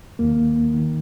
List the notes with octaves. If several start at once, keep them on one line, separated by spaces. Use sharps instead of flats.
D#2 D#3 A#3
D#3